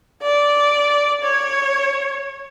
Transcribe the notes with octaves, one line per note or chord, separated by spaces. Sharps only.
D5
C#5